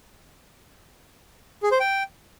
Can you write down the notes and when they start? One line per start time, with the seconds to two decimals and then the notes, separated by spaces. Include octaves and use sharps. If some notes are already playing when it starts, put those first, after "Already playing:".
1.63 G#4
1.72 C5
1.80 G5